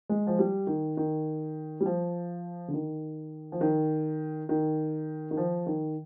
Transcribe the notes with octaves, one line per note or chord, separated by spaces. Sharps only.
G#3
F3
G3
D#3
D#3
G3
F3
D3
D#3
F3
D#3
D#3
D#3
F3
D#3